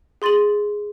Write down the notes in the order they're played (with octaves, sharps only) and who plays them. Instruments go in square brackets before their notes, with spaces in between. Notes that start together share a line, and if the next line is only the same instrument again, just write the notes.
[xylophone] G#4 C6 A6 D#7 F#7